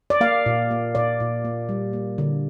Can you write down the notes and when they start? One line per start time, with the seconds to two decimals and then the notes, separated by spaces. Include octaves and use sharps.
0.10 D5
0.21 A#3 F5
0.46 A#2
0.71 A#3
0.95 A#2 D5
1.20 A#2
1.45 A#3
1.69 G3
1.93 A#3
2.18 D3